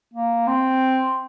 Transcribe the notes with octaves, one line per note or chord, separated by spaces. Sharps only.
A#3
C4